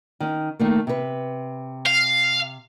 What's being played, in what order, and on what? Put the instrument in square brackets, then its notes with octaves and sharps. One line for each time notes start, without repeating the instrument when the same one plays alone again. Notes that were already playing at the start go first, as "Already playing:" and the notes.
[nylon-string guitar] D#3 C#4
D#3 A3 A#3
C3 B4
[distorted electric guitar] F5